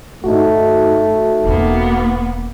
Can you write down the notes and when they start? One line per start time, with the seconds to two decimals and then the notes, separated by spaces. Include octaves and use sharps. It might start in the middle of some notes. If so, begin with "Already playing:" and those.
0.24 G2 A3 D#4 F#4
1.44 E1 A#3 B3 C#4